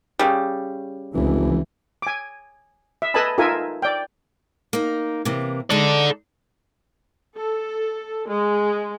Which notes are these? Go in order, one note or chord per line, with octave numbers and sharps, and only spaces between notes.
C#3 G3
F1 C#2 E3
G#5 D6
E5
A4 B4 D#5 G#5 A5 B5
D#4 F4 A4 A#4 E5 G#5
D5 G5
A#3 D#4
C3 E3 A#3
G#3 D#4 A4 D5
A4
G#3